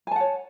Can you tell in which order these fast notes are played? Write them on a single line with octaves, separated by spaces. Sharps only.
G#5 A5 F#5 C#5